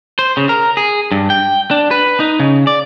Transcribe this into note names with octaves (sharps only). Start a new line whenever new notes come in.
C5
C#3
A#4
G#4
G2
G5
D4
B4
D#4
C#3
D5